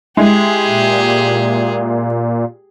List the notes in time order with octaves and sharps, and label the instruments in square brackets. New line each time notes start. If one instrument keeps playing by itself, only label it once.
[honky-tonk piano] G#3 E4 [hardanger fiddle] G4 G#4
[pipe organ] A#2